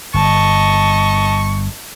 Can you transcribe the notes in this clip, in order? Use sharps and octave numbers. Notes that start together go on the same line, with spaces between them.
G1 D#5 A5 C#6